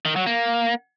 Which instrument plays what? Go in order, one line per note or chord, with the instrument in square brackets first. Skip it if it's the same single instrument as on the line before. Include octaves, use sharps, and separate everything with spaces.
[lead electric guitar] D#3
F#3
A#3